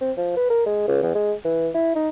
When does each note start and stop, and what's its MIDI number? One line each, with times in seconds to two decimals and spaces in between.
0.01 0.12 60
0.17 0.36 53
0.36 0.46 71
0.50 0.64 70
0.66 0.84 56
0.88 1.01 37
1.02 1.10 40
1.15 1.33 56
1.44 1.69 52
1.74 1.93 64
1.95 2.09 63